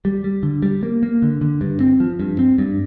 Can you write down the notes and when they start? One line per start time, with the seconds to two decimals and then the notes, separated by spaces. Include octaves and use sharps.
0.05 G3
0.24 G3
0.43 D3
0.62 G3
0.83 A#3
1.03 A#3
1.22 D3
1.41 D3
1.61 G2
1.80 C4
2.00 F3
2.20 G2
2.39 C4
2.58 G2